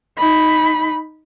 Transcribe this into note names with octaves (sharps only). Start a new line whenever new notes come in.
D#4 B5